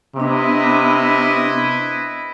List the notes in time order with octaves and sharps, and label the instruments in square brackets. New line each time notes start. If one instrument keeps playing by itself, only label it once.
[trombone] C3 [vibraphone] B3 D4 [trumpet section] E4 B4 D#5